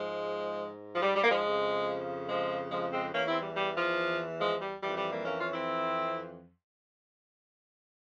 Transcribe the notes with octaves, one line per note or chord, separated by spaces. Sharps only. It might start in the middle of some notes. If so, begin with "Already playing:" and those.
Already playing: G#2 F3 G#3
F3
G3
G3
A#3
F3 G#3
F2 C#3 F3
F3 G#3
F3 G#3
G#3 C4
E2 E3 A#3 C#4
C4 E4
G3
G3
F3
F3 G#3
G3
F2 E3 G3
G3
G3 A#3
A#3 C#4
C#4 F4
C4 E4